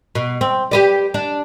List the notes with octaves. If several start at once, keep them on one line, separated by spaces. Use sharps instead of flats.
B2
C4
G4 B4 D5
D4